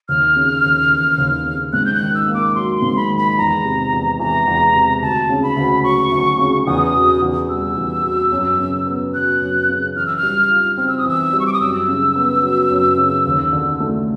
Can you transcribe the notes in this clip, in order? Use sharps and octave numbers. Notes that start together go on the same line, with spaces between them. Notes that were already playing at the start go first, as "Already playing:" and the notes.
D#2 F6
C#3
D#2
E3
D#2
C#3
G#2 F#6
G6
F#6
D#3
E6
A#3
D6
F#3 C6
C6
G#2
B5
D#3
B5
E2 A#5
C3
E2
E3 A#5
E2
C3
D2 A5
C#3
B5
D2
F#3 C#6
D2
C#3
E2 D#6
B2
E2
G3 E6
E2
B2
F#2
C#3
B3
F#3 F#6
F#2
C#3
E3 F6
E6
F6
G3
F4
C4 F6
E6
D#6
E3 E6
G3
C#6
D6
D#6
F#2 E6
C#3
B3
F#3
F#2
C#3
D#2
D3
A3